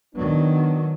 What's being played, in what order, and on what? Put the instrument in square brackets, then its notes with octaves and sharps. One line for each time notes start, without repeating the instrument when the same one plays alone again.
[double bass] D#3 F#3 [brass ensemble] B3 D4